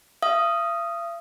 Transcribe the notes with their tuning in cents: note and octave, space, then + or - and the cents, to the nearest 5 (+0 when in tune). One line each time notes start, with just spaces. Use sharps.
F5 -45 D#6 +0